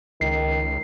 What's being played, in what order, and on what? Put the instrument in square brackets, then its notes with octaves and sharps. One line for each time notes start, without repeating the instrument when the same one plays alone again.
[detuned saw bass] C#2 [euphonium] D#3 [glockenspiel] C7